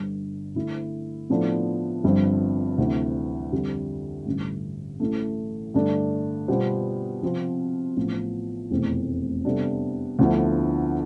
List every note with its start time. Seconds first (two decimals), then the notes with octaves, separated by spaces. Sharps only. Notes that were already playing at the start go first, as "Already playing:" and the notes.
Already playing: G1 G2 D3
0.55 D3 A3 E4
1.30 A2 F3 B3 D4 A4
2.04 G1 G2 F3 C4
2.78 D2 C3 E3
3.52 F2 D3 G3
4.26 A1 G2 D3
5.00 A1 A2 E3 A3
5.74 G2 D3 A3 D4
6.48 B2 G3 B3 F4 C5
7.23 C3 F3 C4 F4
7.97 A1 A2 F3 B3
8.71 F1 E2 B2 A3 C4
9.45 C3 G3 B3 D4 A4
10.19 D2 D3 F3 B3 E4